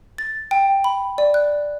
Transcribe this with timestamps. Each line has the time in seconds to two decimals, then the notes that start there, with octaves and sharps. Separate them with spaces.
0.18 A6
0.51 G5
0.84 B5
1.18 D5
1.34 F#6